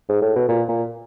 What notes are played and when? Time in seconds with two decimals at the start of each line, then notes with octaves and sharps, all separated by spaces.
0.09 G#2
0.22 A2
0.36 B2
0.49 A#2
0.69 A#2